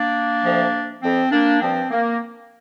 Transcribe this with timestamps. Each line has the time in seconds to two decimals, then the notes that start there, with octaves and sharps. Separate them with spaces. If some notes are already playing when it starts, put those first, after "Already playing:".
Already playing: A#3 D4
0.44 D2 C3 F3
1.02 F2 F3 C4
1.32 A#3 D4
1.61 G2 F3 C4
1.91 A#3